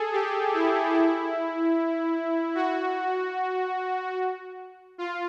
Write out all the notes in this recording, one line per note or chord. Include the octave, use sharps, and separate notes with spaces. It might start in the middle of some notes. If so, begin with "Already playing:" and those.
Already playing: G#4 A4
G4
E4
E4
F#4
F4